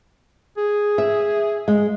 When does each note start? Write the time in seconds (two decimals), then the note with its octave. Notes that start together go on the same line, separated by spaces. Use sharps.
0.57 G#4
0.98 E5
1.68 G#3